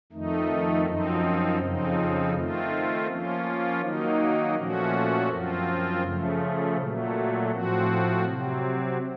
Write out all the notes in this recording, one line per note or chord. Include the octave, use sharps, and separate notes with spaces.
F2 D#3 A3 D#4
F#2 F3 C4 D#4
F2 C#3 F3 C4 D#4
D#3 A3 C4 F4
F3 A#3 C#4 F4
D#3 F#3 A#3 D#4
A#2 F3 A3 C#4 F#4
F#2 F3 C4 F4
C#3 F3 A3
A#2 F#3 A3
A2 F3 C4 F#4
C3 F#3 C4